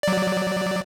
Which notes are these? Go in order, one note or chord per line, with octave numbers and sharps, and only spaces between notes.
F#3 D5